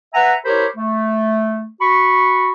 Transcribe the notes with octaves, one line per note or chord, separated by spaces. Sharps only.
B4 E5 F#5 G#5 A#5
E4 G4 A#4 C5 C#5 B5
A3
F#4 B5 C#6